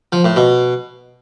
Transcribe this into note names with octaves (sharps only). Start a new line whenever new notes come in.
F3
A2
B2